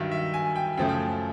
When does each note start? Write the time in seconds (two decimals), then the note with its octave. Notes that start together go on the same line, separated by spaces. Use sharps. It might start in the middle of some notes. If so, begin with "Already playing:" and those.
Already playing: G2 D#3 F#3 E5
0.11 E5
0.34 G#5
0.56 G5
0.77 F#2 C#3 F3 A3 G5
0.89 G5